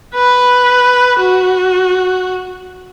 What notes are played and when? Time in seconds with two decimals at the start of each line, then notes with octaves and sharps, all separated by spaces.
0.15 B4
1.19 F#4